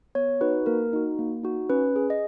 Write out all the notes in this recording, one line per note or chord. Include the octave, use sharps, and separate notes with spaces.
B3 C#5
D#4 F#4 B4
A#3 A#4
D#4 F#4
A#3
D#4 F#4
C#4 B4
G#4
D#5